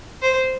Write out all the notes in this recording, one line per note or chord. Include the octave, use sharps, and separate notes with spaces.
C5